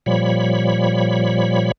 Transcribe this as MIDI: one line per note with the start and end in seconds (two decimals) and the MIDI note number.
0.06 1.72 46
0.06 1.72 53
0.06 1.72 55
0.06 1.72 73
0.06 1.72 83